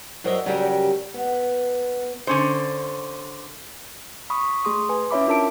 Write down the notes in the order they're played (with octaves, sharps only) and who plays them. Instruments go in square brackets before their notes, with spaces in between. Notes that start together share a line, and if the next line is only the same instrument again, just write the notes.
[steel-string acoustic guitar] G2 F#3 A#4 C5 D#5 E5
C#3 F#3 G3 G4 G#4 A#4
B3
[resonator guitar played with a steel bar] D3 C#4 C5
[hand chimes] B5 C#6 D#6
A3 G#4 C6 D#6
B4 G#5
C#4 E4 C#5 E5 B5 D6
D4 F4 A#4 A5 D7